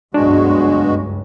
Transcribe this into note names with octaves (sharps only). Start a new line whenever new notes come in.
F#1 C#2 G2 B2 G#3 D4 F#4